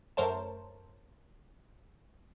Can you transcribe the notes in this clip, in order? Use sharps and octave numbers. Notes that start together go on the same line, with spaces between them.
F#2 A3 A#4 C5 C#5 A5